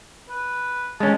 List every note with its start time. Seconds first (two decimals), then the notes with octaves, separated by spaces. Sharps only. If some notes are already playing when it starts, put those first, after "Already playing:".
0.30 B4
1.00 G#3 C#4 A5